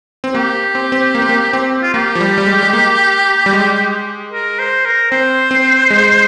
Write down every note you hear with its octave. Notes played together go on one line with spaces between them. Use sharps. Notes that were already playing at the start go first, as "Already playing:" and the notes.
C4
A#3 G4
C4
C4
A#3
C4
A#3
C4
F4
A#3 G4
F3
G3
G3
G#3
G#3
A#3
G3
G#3
A#4
C5
A#4
C4 C5
C4
G#3